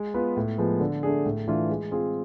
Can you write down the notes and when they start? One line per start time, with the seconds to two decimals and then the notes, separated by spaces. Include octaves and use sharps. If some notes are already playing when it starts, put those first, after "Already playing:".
Already playing: G#3
0.14 B3 F4 B4
0.37 A2
0.58 F3 G#3 B3
0.80 D3
1.03 A3 D4 G#4
1.25 A2
1.47 E3 A3 D4 F4
1.69 G#3
1.91 C4 F4 G#4